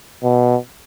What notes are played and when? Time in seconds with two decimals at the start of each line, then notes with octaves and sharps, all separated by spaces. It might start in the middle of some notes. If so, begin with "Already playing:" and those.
0.23 B2